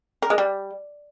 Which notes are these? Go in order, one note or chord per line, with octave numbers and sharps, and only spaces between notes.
A#4
G#3
G3